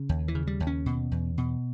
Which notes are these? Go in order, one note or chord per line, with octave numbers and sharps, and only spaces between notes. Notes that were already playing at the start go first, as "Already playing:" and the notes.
Already playing: C#3
D#2
E3
C#3
G3
D#2
C#4
B2
E2
B2